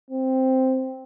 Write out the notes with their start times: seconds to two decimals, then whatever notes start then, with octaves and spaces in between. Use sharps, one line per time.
0.10 C4